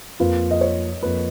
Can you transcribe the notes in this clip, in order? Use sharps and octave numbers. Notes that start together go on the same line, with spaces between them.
F2 F3 A#3 F4 B4
D#5
C#5
F2 F3 A#3 F4 B4